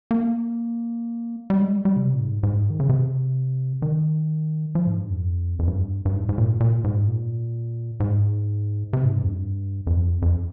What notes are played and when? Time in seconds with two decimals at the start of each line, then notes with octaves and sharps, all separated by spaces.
0.11 A#3
1.50 G3
1.62 G#3
1.73 G3
1.85 G3
1.97 C3
2.14 A#2
2.20 G#2
2.43 G#2
2.70 D#3
2.80 C#3
2.89 C3
3.82 D#3
4.75 F3
4.87 G#2
4.98 G2
5.10 F2
5.59 F2
5.68 G2
6.05 G2
6.15 G#2
6.29 G#2
6.38 A#2
6.60 A#2
6.84 G#2
7.08 A#2
8.00 G#2
8.93 C3
9.05 G#2
9.17 G2
9.23 F2
9.29 G2
9.87 F2
10.22 F2